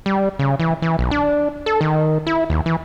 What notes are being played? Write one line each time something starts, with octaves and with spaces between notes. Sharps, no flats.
G3
C#3
E3
E3
B1
D4
A4
D#3
E4
D#2
E3